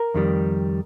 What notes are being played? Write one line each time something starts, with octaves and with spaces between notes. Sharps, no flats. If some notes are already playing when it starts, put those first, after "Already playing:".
Already playing: A#4
F2 D#3 G3